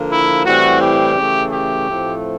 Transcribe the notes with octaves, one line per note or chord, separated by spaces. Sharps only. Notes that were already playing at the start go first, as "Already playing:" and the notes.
Already playing: D3 F3 A#3
E4
A2 E3 G3 C4 F#4
G4
C#3 E3 A3
G4
A2 F3 A3 C4